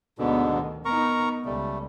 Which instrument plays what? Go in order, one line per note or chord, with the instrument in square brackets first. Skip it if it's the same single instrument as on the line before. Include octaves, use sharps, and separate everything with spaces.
[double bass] D2 B3 [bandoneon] G#2 B2 D3
[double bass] D#3
[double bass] B3 D#4 [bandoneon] A#4 A#5 C#6
[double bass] C#2 [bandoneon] G3 A3